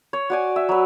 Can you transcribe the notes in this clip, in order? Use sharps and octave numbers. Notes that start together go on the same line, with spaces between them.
C#5
F#4 D5 G#5
E5
F#3 B4